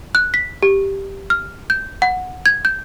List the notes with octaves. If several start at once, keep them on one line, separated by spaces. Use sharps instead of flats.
F#6
B6
G4
F6
G6
F#5
G#6
G6